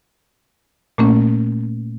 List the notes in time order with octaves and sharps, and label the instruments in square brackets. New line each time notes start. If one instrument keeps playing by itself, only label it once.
[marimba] A#2 A3 A#3 C#4